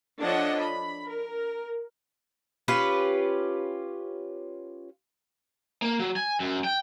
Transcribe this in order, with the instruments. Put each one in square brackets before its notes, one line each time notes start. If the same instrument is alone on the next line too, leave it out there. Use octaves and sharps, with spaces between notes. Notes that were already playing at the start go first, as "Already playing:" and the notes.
[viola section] F3 D4 A4 C#5 D#5 F#5
B5
A#4
[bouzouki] C#4 F4 G4 B4
[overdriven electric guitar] A#3
F#3
G#5
F#2
G5